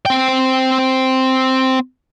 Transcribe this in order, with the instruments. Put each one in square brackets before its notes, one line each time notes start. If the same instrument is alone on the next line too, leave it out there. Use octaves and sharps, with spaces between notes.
[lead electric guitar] C4 G5